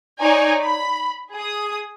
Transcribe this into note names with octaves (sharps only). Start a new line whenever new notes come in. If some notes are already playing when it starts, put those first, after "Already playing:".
D#4 C#5 D5 G#5 A#5
B5
G#4 D#6